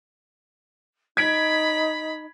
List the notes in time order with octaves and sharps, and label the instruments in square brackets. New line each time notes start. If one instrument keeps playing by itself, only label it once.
[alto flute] D#4 [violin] B5 [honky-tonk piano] G#6 B6 D7